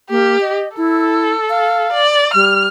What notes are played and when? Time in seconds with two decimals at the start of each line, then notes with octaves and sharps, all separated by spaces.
0.10 A#3 G4
0.41 D#5
0.77 E4 A4
1.50 F5
1.93 D5
2.34 G3 F6